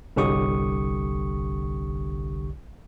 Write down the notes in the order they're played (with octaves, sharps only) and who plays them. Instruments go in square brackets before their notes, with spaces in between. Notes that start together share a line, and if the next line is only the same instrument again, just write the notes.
[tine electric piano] G1 C2 D3 G4 C#6 D#6